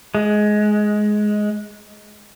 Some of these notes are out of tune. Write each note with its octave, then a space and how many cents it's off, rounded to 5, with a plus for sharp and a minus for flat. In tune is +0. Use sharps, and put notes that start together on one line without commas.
G#3 +15